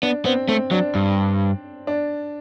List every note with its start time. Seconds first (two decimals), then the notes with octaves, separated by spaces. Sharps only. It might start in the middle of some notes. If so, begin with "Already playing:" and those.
0.03 B3 D4
0.25 B3 C4
0.49 A3 C4
0.71 F#3 D4
0.95 G2
1.87 D4